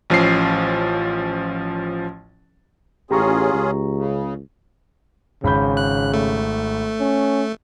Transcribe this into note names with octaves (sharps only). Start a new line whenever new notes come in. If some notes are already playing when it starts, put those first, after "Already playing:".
A1 F3 C#4 C7
A1 C#4 F4 G4 G#4 A#5 C#6
C#2
C#3
G#1 C#3 B5 G6
F#6
A3
C#4